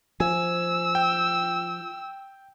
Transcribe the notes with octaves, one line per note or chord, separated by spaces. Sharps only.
F3 G#5 E6
G5